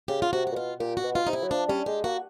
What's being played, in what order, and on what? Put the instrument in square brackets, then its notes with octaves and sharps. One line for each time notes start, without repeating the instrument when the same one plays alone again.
[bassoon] C#3 [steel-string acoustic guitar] G4
[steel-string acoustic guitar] F4
[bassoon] C3 [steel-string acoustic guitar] F#4
[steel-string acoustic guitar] F#4
[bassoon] A#2
[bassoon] B2 [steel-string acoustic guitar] F4
[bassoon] A#2 [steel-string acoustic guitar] G4
[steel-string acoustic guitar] F#4
[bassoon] B2
[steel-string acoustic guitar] F4
[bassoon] C3 [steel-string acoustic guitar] D#4
[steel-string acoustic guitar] E4
[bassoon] F#3
[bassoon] F3 [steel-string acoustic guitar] D4
[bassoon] G3 [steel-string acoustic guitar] C#4
[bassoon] G#3 [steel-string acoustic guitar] G4
[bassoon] A#3 [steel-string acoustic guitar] F#4